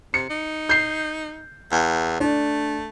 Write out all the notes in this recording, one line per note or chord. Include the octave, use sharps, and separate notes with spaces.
C3 C#7
D#4
G6 C7
E2
A3 D4